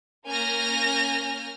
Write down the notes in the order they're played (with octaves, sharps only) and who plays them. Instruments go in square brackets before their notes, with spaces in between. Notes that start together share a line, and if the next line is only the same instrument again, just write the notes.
[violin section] A#3 C#4 G#5 F6 G6 A#6